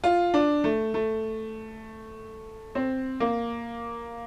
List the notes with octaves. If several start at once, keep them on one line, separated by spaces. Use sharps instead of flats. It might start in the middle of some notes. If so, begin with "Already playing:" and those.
F4
D4
A3
A3
C4
A#3